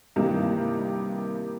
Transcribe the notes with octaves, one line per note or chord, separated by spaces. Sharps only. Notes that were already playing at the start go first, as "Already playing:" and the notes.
G2 C3 D#3 E3 A#3